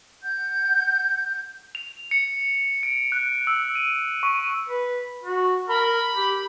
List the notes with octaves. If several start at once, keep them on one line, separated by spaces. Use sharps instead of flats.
F#5 G6
F7
C#7
D7
F#6
E6
D#7
C#6
B4
F#4
A#4 B5
G4